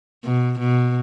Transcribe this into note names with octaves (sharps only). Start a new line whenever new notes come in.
B2
B2